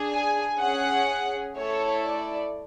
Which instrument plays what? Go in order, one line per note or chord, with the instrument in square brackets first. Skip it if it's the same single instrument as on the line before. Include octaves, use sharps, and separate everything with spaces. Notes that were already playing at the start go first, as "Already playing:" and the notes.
Already playing: [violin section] D4 G#4
G#5
C#4 G#4 F#5
A3 E4 A4 C#5
D5